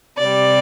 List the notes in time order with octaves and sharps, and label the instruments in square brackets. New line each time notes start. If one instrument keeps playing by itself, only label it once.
[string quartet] C3 G3 D5